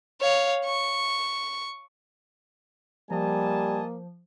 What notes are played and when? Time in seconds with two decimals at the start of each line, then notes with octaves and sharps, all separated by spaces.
0.21 C#5 F5
0.65 C#6
3.11 F3 G3 A#3 D#5 G#5 A5